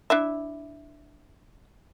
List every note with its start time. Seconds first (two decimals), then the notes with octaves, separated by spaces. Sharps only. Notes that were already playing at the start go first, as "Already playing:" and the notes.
0.10 D4 E4 E5